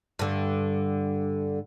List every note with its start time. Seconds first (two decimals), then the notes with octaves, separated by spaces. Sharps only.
0.19 G2 D3